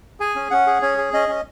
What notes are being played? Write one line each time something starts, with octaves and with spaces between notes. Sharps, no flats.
G#4 G#5
C#4
C#4 F#5
G#4
C#4 C#5
G#4
C#4 D#5
C#4